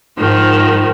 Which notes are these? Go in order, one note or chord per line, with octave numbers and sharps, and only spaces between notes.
G#2 D#3 F3